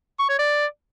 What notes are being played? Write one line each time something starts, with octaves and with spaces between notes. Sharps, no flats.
C#6
C#5
D5